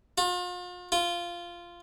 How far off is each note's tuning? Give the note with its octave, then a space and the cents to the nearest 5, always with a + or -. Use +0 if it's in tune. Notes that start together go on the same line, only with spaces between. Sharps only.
F4 +40
F4 -10